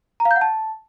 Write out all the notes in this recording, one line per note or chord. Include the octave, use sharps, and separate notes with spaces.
A#5
F5
G6
F#5
A5